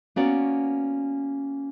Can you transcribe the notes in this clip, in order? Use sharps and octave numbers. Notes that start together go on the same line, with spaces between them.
A#3 B3 C#4 F#4 D5